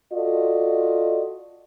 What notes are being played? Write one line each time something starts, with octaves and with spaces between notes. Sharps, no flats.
F4 F#4 A4 D5 D#5